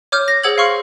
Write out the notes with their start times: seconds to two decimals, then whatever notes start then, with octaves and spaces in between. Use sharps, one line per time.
0.12 C#5 D6 F6 G6
0.28 A#6
0.44 G#4 C5 F#5 E6 G#6 F#7
0.58 F5 C6 C#6 F6 C#7